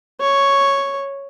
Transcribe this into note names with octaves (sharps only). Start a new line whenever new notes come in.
C#5